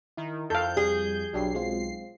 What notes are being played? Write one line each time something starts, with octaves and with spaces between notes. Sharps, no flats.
D#3 E4
F2 A4 F5 G6
G3 G#4
B1 F#3 D4 G4 C7
G#3 C4 F4